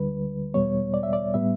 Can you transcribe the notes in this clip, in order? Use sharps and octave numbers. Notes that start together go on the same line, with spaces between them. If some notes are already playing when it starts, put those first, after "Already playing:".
Already playing: D2 D3 G3 B4
E2 B2 G3 B3 C#5
D5
E5
D5
A2 G3 B3 E5